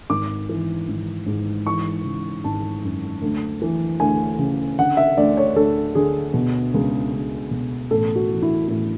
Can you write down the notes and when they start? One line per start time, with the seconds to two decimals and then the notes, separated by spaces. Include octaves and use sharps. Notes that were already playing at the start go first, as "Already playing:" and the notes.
0.09 G#1 D6
0.49 E3
0.88 G#1
1.26 G#2
1.66 E3 C#6
2.05 C#3
2.44 G#1 A5
2.83 F#2
3.22 D2
3.62 E3
4.00 D2 G#5
4.39 C#3
4.78 D3 F#5
4.97 E5
5.17 D2 D5
5.37 C#5
5.56 D2 A4
5.95 D3 G#4
6.34 B2
6.74 C#2
7.13 C#2
7.51 B2
7.91 A1 A4
8.16 F#4
8.29 E3
8.42 E4
8.68 A1 E4